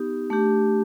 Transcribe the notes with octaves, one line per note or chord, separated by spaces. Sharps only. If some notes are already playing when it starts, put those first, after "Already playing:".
Already playing: B3 D#4 G4
A3 D4 G4